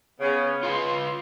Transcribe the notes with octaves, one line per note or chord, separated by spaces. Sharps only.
C#3 B3 C#4
F4 B4 C6